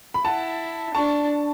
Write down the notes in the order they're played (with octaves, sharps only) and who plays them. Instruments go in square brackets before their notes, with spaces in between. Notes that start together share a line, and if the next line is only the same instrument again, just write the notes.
[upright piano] B5
[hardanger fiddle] E4 [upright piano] F#5 A5
[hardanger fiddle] D4 [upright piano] A5 C#6